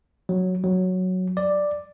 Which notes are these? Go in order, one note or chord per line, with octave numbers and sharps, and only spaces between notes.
F#3
F#3
D5